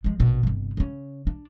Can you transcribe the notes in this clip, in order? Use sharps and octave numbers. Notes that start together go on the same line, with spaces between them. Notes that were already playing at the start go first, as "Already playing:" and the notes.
F3 G#3
A#1 B2
G1 C3
C#3 C#4
D4